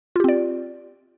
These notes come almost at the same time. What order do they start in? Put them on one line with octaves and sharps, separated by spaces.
F4 G4 C4 D5